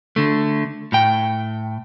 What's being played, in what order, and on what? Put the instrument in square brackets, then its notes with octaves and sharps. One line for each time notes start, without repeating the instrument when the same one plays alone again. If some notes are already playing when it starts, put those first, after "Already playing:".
[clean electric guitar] D3 A3
A2 G5